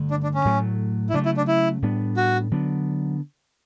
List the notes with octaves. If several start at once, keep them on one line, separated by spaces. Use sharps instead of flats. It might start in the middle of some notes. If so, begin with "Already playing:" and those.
Already playing: G2 D3 A3
D4
D4
C#4
A2 F#3 A3
E4
C#3 F#3 A3 D4
E4
D4
E4
A2 G3 B3 D4
F#4
D3 F#3 B3 D4